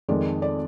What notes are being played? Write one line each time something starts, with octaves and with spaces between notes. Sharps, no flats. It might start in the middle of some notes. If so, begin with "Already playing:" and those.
F2 D#3 G#3 D5
D5